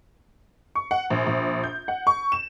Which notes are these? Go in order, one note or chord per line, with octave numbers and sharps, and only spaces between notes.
C#6
F#5
A#1
A#1
G6
F#5
C#6
E7